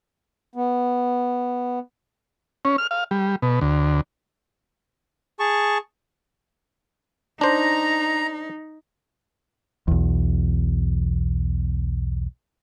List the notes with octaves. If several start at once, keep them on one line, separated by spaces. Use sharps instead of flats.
B3
C#4
F6
F5
G3
B2
D2
G#4 A5 C#6
D4 D#4 C5 A#5
B1 E2